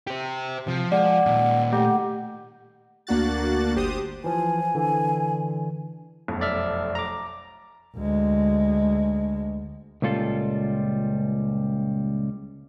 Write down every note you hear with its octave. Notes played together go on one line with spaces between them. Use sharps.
G4 C5
C3 F3
G#3 D5 F#5
A#2 D#3
A3 G4 F#5
D2 A#3 D4 F#4 F#6 A6
G1 G4 C5 D#6
E3 F3 G#5
D3 E3
F1 B1 F#2
D5 E5 F6
A#5 D6
D2 G#3
C#2 A#2 G3 F4 A4